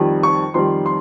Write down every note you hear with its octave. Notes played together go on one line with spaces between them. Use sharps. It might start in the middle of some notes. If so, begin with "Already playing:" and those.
Already playing: F2 D#3 G3
C#6
F2 D#3 G3 C6
C6